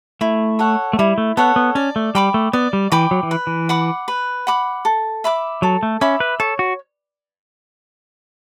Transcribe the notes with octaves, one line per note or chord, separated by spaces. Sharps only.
A3 E4
A4 C#5 F#5
A3
G3 E4
A3
B3 A4 C#5 F#5
B3
C#4 D5
A3
G3 G5 B5 D6
A3
B3 D5
G3
E3 G5 B5 D6
F#3
E3
B4
E3
F#5 B5 D6
B4
F#5 B5 D6
A4
E5 B5 D6
F#3 A4
A3
C#4 E5 B5 D6
B4
A4 C#5
F#4